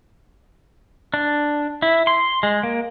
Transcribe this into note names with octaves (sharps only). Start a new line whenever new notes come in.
D4
E4
C6
G#3
A#3